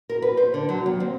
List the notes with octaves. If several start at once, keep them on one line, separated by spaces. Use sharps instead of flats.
A#4
B4
C5
D3
F#3
D#2
C4